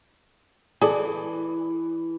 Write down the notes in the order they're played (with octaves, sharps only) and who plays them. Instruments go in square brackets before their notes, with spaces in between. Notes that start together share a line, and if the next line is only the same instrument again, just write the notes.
[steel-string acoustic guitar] E3 [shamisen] G#4 A4 D5